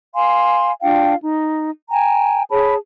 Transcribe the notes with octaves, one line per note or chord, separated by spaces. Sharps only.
F5 G#5 C6
D4 F4 F5 G5
D#4
G5 G#5 A#5
G#4 C#5 A5 B5